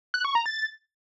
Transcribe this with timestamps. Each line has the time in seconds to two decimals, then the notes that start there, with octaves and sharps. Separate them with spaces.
0.14 F#6
0.25 C#6
0.35 A#5
0.46 A6